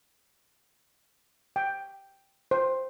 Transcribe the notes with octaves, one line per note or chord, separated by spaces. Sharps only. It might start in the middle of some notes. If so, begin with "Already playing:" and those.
G5
C5